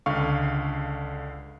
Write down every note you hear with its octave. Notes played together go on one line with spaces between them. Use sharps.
C#2 D3 F5 C#6